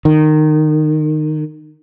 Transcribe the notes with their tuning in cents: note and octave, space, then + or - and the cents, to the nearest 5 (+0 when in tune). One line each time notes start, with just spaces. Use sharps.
D#3 -20